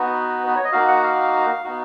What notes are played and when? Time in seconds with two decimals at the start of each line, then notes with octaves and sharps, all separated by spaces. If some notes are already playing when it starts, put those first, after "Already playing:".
Already playing: B3 D#4 F#4 B4
0.47 B4
0.56 C#5
0.64 D#5
0.72 A#3 D#4 F#4 F5
0.88 F#5
1.03 F5
1.64 B3 D#4 F#4